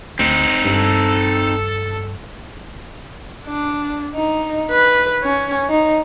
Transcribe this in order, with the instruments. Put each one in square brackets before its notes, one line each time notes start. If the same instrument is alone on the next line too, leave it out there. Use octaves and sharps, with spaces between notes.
[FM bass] D2 [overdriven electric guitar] C4 D#4
[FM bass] G2 [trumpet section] A4
[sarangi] D4
D#4
B4
C#4
D#4